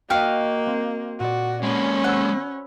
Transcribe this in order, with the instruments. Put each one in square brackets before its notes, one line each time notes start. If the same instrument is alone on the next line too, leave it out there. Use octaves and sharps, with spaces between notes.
[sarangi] A#3 [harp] F#4 D#5 [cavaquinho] F5 G5
[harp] C4
[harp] A#2 D5 [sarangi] F#4
[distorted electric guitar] G#3 A#3 [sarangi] C#4 [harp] B5
[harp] C5 B5 E6 [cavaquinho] F#5